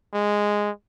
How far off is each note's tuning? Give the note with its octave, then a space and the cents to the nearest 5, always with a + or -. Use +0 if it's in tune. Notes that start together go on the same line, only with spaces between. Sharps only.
G#3 -5